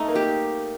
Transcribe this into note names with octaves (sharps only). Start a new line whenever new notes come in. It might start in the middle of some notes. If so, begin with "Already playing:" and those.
Already playing: A3 D#4
A#3
G4